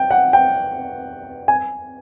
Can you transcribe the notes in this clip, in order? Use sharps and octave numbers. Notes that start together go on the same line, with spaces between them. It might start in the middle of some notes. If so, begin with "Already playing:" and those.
Already playing: G5
F#5
G5
G#5